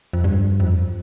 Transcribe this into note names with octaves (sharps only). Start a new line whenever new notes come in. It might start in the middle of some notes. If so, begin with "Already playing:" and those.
F2
G2
F2